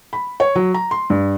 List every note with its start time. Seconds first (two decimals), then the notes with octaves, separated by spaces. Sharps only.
0.13 B5
0.40 C#5
0.56 F#3
0.74 A#5
0.91 C6
1.10 G2